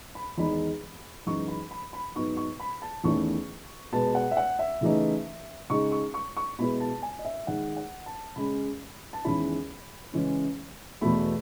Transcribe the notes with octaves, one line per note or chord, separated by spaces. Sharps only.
B5
E2 D#3 G#3 D#4 B5
F#2 E3 G#3 D#4 C#6
B5
B5
B5
G#2 F#3 B3 D#4 C#6
C#6
B5
A5
E2 D#3 A3 C#4 E4 C#6
B2 G#3 B3 A5
F#5
E5
F#5
E5
C#3 E3 A3 D#4
C#3 G#3 D#4 C#6
C#6
C#6
C#6
B2 G#3 B3 E4 B5
A5
G#5
D#5
E5
D#3 G#3 D#4 F#5
F#5
A5
C#3 G#3 C#4 B5
A5
E2 D#3 G#3 C#4 E4 B5
C#3 E3 G#3 C#4
E2 B2 A3 B5